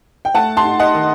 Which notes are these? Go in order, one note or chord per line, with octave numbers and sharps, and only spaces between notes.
G5
A3 F#5 A5
A5 C6
D#4
D#5 F#5
D#3